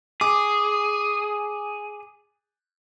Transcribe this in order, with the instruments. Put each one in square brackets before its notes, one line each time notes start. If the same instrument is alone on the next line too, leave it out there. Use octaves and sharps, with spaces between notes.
[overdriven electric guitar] G#4 [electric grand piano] D6